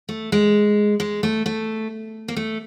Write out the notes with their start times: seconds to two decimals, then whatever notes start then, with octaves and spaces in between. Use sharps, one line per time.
0.09 A3
0.32 G#3
1.00 G#3
1.23 A3
1.46 A3
2.28 A#3
2.36 A3